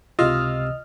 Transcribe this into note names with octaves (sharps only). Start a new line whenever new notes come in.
C#2 C3 F4 D#5 E6 F6